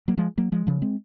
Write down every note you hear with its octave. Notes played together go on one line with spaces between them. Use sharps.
F#3 A#3
F3 G#3
F#3 A#3
F3 G#3
C#3 F3
G#3 C4